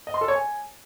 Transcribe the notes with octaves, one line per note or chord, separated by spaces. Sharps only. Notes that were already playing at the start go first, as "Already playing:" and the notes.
D#5
C6
A4
C#5
G#5